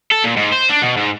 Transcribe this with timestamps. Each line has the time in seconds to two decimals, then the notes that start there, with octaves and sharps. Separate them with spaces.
0.12 A4
0.24 A#2
0.37 G#2
0.52 C5
0.70 D4
0.82 B2
0.97 G#2